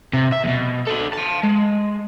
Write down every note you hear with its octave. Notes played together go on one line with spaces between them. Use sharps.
C3
E5
E2 B2
F#4 A4
F5 A5
G#3